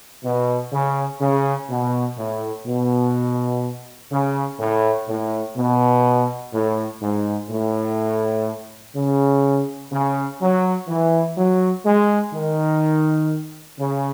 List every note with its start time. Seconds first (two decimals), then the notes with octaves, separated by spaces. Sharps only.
0.24 B2
0.73 C#3
1.21 C#3
1.70 B2
2.18 A2
2.66 B2
4.11 C#3
4.60 A2
5.08 A2
5.56 B2
6.53 A2
7.02 G#2
7.50 A2
8.96 C#3
9.92 C#3
10.41 F#3
10.89 E3
11.37 F#3
11.86 G#3
12.34 D#3
13.79 C#3